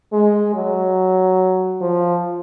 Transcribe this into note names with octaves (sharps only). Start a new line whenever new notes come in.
G#3
F#3
F3